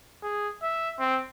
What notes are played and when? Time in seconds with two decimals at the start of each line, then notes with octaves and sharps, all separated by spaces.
0.23 G#4
0.62 E5
0.99 C4